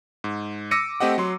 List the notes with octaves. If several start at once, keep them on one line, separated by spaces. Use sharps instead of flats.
G#2
D6 E6 A#6 C#7 D#7
A3 C4 G4 D#5 F#5
F#3 C6